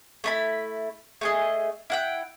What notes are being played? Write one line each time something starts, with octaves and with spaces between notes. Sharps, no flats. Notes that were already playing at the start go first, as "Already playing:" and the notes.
A3 E4 B5
A3 G#4 D#5
E4 F#5 G5